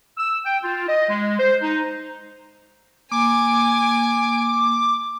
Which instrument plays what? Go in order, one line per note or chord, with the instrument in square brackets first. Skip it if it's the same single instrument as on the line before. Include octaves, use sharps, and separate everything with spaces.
[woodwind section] E6
G5
F4
D#5
G#3
C5
D#4
[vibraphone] A#3 [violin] G#5 [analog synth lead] D6